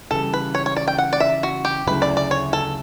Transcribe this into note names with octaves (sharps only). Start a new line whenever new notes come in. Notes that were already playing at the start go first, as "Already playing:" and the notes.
C#3 E3 G3 A4
B4
C#5
C#5
D5
G5
F#5
D5
E5
F#4
G4
D2 C#3 F#3 A3 E4 B4
D5
D5
C#5
A4